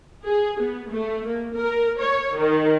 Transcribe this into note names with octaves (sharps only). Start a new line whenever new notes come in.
G#4
B3
A3
A#3
A#4
C#5
D#3